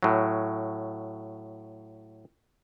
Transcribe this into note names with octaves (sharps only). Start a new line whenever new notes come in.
A2 F#3